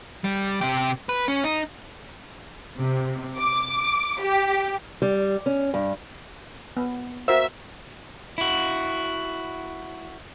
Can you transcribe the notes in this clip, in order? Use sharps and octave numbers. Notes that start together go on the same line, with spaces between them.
G3
C3 G4
B4
C#4
D#4
C3
D6
G4
G3
C#4
G2
B3
F#4 A#4 C5 E5 F5
E4 F#4